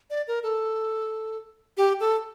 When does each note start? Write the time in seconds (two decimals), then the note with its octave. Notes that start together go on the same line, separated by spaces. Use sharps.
0.10 D5
0.28 A#4
0.43 A4
1.77 G4
2.00 A4